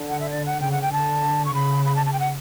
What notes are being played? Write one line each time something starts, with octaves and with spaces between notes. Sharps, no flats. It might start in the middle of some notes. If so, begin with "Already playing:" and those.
Already playing: D3
F#5
E5
D5
F#5
C#3 G5
F#5
G5
D3 A5
C#6
C#3 B5
B5
A5
A5
G5
F#5